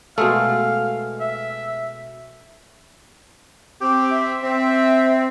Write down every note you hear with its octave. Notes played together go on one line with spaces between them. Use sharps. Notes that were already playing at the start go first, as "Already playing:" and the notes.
B2 G#3 A3 F5
E5
C4 G4
E5
C4